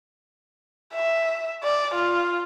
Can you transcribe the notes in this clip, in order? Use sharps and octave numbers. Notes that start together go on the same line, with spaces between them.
E5
D5
F4